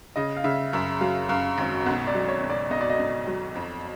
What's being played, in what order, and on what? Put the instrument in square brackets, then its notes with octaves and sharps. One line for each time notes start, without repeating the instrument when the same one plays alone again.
[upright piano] C#3 [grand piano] D#5
[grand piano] F5
[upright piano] C#3 [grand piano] E5
[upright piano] F#2 [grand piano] E5
[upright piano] F#3 [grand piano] F5
[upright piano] F#2 [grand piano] F5
[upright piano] G#1
[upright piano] B1 [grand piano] F#5
[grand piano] D5
[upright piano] F#3
[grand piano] C#5
[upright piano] B1
[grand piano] D5
[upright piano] B1 [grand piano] D#5
[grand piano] D5
D#5
[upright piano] B1
F#3
F2